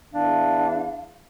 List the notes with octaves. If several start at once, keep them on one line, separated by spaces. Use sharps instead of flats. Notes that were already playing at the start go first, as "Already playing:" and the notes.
E2 D4 F5